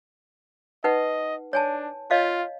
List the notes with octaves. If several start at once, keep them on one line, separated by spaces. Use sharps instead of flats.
D#4 B4 D#5 F#5
D4 C#5 G#5 A5
F4 C#5 D#5 F5